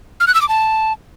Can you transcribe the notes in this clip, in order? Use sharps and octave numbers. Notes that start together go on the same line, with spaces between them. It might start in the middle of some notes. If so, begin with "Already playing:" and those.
F6
F#6
E6
D6
A5